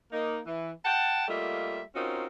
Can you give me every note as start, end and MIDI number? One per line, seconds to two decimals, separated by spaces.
0.12 0.38 58
0.12 0.38 63
0.46 0.71 52
0.84 1.23 78
0.84 1.23 79
0.84 1.23 81
1.28 1.80 55
1.28 1.80 57
1.28 1.80 58
1.28 1.80 65
1.28 1.80 75
1.28 1.80 76
1.95 2.24 60
1.95 2.24 61
1.95 2.24 63
1.95 2.24 65
1.95 2.24 66
1.95 2.24 70